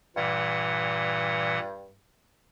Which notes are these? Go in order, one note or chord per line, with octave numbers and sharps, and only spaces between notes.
G2 A#2 E3 F#5